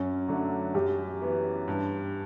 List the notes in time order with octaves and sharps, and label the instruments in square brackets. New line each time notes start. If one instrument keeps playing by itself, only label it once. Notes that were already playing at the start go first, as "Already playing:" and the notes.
Already playing: [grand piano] F#2 [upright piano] C#4
[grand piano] D3 F#3 A3 D4
[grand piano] F#2 [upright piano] G4
[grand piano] E3 B3
G2